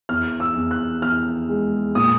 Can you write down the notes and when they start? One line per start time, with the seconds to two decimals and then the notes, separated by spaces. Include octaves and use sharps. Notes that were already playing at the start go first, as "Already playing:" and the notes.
0.09 E2 F6
0.40 E6
0.56 E2
0.71 F#6
1.02 E2 F6
1.49 G#3
1.95 A#2 D#6